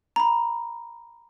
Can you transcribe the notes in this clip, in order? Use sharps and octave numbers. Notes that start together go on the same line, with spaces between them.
A#5 B5